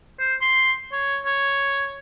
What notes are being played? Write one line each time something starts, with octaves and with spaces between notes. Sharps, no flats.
C5
C6
C#5
C#5